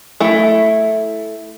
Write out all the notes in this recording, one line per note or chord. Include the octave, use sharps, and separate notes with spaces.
A3 E4 E5